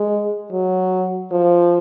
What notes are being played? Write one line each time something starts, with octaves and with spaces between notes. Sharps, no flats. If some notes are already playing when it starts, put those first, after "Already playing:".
Already playing: G#3
F#3
F3